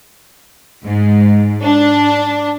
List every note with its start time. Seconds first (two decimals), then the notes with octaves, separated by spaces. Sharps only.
0.83 G#2
1.63 D4